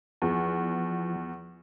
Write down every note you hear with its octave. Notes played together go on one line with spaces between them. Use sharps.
E2 F3